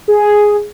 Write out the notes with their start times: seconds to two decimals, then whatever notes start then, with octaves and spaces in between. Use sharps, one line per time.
0.08 G#4